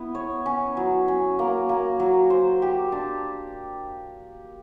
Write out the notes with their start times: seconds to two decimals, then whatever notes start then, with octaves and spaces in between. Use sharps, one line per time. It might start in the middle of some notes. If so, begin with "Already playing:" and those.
Already playing: B3 E4
0.15 C#5
0.46 C#4
0.77 F#3
1.08 C#4
1.39 A#3
1.69 A#3
2.00 F#3
2.30 C5
2.62 G4
2.92 D4